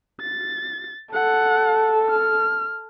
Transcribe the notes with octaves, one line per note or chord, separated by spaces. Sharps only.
A6
A4 F#5
F6